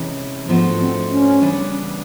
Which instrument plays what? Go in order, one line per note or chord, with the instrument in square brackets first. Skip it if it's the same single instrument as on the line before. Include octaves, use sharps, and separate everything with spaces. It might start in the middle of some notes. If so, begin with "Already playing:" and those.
Already playing: [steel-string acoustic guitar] C3 E3 G#3 C#4
[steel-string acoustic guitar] G#2 F3 A3 D4 F#4 [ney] B3
[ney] C4
C#4
[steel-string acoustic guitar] C#3 E3 G3 B3 D4